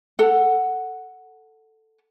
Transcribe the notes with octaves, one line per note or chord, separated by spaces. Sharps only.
A4 F#5